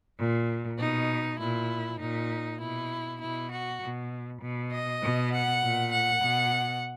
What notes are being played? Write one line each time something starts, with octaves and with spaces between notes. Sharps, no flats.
A#2
B2 D#4
A#2 E4
A#2 D#4
B2 E4
B2 E4
F#4
B2
B2
D#5
B2
F#5
A#2
F#5
B2